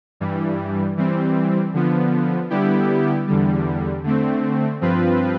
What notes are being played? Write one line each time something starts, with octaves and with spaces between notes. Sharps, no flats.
G2 E3 G3
E3 G3 C4
D3 F3 B3
D3 G3 B3 E4 G4
E2 D3 G3
D3 A3 C4
G2 F3 C4 F4 B4